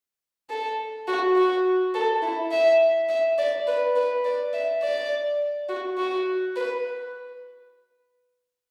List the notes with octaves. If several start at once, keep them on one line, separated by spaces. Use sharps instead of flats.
A4
F#4
F#4
A4
E4
E5
E5
D5
B4
B4
D5
E5
D5
F#4
F#4
B4